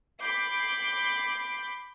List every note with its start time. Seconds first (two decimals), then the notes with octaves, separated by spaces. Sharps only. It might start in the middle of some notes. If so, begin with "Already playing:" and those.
0.21 B5 D6 G6 C7